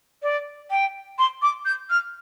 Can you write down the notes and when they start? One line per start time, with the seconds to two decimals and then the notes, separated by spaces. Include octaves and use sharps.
0.22 D5
0.70 G5
1.18 C6
1.42 D6
1.65 G6
1.90 F6